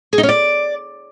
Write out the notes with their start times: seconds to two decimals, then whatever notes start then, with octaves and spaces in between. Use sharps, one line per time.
0.13 G#4
0.18 D#4
0.23 C#4
0.29 D5